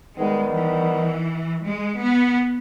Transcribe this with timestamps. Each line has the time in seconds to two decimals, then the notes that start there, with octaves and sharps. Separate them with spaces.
0.16 D#3 G3 G#3 B3
0.54 E3
1.64 G#3
2.01 B3